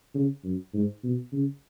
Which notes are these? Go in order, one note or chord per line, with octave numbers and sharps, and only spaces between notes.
C#3
F#2
G#2
B2
C#3